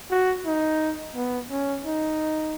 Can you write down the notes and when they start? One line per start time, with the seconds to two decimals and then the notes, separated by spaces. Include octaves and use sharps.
0.10 F#4
0.45 D#4
1.15 B3
1.51 C#4
1.86 D#4